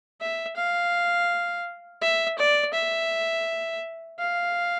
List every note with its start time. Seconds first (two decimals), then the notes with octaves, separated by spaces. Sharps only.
0.21 E5
0.57 F5
2.02 E5
2.39 D5
2.74 E5
4.20 F5